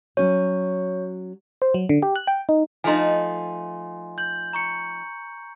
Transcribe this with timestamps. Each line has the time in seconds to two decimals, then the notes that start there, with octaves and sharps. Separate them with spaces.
0.17 F#3 C#4 F#4 C#5
1.62 C5
1.74 F#3
1.89 D3
2.03 G4
2.16 F#6
2.27 G5
2.49 D#4
2.84 F3 A3 D#4 G#5 C6
4.18 G6 F#7
4.53 A#5 C#6 C#7